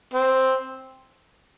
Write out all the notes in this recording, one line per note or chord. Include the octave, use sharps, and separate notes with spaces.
C4